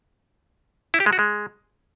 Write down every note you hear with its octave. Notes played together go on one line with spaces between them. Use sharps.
E4
G4
G#3
F#4
G#3